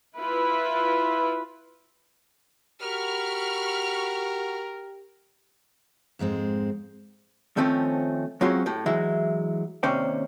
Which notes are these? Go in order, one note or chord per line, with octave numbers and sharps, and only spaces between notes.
E4 F4 B4
F#4 G4 A#4 B5 C#6 F6
F2 G#2 G#3 C4
D#3 F3 A3 C4 C#4
F#3 G#3 C4 C#4 F4 F#4
A2 G4
E3 F#3 G#3 E4
D#2 C3 C#4 C5 D5 G5